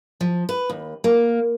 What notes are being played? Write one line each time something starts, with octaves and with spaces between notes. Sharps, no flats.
F3
B4
D#2
A#3